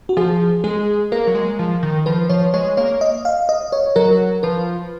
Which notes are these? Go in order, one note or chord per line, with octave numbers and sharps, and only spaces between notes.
F#4
F3 G#4
G#3 G#4
A#3 A#4
F#3
G#3
F3
D#3
F3 B4
F3 C#5
G#3 C#5
A#3 C#5
D#5
F5
D#5
C#5
F#3 A#4
F3 B4